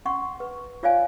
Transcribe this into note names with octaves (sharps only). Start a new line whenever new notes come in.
C#4 F#5 C6 C#6
B4
F4 C#5 D5 F5 G#5